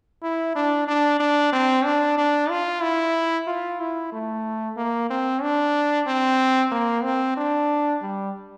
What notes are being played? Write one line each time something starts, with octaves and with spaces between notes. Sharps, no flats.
E4
D4
D4
D4
C4
D4
D4
F4
E4
F4
E4
A3
A#3
C4
D4
C4
A#3
C4
D4
G3